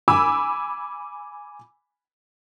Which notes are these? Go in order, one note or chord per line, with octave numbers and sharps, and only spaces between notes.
G#5 B5 D6 E6